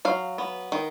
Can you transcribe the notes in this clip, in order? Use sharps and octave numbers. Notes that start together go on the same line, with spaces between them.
F#3 F5
B3
D#3